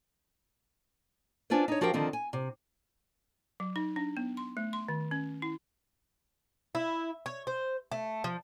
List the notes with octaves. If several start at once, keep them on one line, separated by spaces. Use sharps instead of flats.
C#4 D4 F4 B4 C5
D#4 C#5
F3 F#4 G4 A#4 F5 G5
D3 D#3 F3 C4
G#5
C3
F#3
D#4
D4
B3
C6
A3
C6
D#3
C#4
E4
E4
C#5
C5
A3
F3